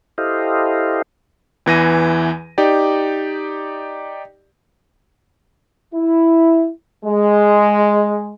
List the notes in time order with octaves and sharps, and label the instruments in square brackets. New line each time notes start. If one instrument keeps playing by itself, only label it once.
[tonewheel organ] E4 G4 A4 C5 D#5 F5
[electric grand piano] E2 E3 A#6 D#7
D#4 G4 D5
[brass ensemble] E4
G#3